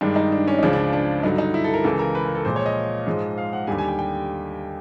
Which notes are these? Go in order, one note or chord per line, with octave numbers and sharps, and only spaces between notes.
G2 D#3 G#3 D4
D#4
D4
C#4
D#4
C#2 C#3 F3 D4
D4
D4
G2 D3 F#3 D#4
D#4
E4
A4
A#4
C#2 C#3 E3 A4
A#4
B4
A#4
A4
A#2 F3 G#3 C5
C#5
D#5
G#2 F3 G#3
F5
F#5
D#2 D3 G3 G#5
G#5
G5
G5